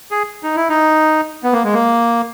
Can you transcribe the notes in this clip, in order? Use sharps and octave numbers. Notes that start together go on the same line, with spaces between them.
G#4
D#4
E4
D#4
B3
A#3
G#3
A#3